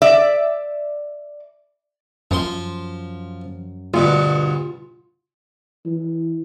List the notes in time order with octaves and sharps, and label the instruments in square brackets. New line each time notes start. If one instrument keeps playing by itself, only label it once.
[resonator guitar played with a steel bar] D5 E5
[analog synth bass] F#2 [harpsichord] F3 C6
[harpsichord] D2 G2 B2 [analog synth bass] F4
[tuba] E3